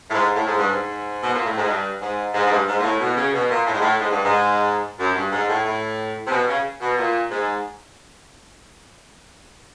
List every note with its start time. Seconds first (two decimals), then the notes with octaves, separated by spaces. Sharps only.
0.09 A2
0.13 G#2
0.35 A2
0.46 G#2
0.57 G2
0.68 G#2
1.23 B2
1.34 A#2
1.45 A2
1.56 G#2
1.67 G2
2.01 G#2
2.34 G#2
2.46 G#2
2.50 G2
2.67 G#2
2.79 A#2
2.83 A2
3.00 B2
3.16 C#3
3.33 B2
3.50 A#2
3.66 A2
3.73 G#2
3.81 A2
3.99 G#2
4.11 G2
4.24 G#2
4.98 F#2
5.15 G2
5.31 G#2
5.48 A2
5.65 A2
6.26 C3
6.31 B2
6.48 C#3
6.81 B2
6.97 A#2
7.30 G#2